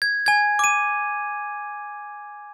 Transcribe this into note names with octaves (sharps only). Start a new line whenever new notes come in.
G#6
G#5 G#6
D6 D#7